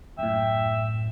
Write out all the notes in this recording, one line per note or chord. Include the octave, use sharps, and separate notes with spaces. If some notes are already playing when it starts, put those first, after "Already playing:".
F#2 A2 E5 G5